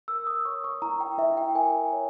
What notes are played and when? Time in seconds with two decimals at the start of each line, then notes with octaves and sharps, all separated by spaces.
0.08 A#4 E6
0.27 D#6
0.45 C#5 C#6
0.64 C#6
0.82 E4 A#5
1.00 G5
1.18 E4 E5
1.37 G5
1.55 A#4 G#5
1.93 C#5